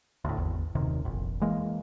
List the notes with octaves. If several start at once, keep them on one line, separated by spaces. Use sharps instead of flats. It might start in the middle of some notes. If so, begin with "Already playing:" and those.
D2 A2
G#1 E2
D#1 F#2 C3 D#3
F1 A#1
E3 G#3 A#3